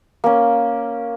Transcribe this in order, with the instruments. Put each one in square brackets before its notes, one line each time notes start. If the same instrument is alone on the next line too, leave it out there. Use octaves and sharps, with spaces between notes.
[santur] A#3 C#4